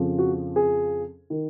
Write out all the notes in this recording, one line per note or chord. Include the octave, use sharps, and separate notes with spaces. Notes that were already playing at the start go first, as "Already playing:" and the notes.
Already playing: F2 C#3 F3
F#4
G#4
D#3